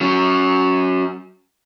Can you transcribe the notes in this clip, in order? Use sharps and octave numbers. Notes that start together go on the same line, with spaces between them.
F#3 C#4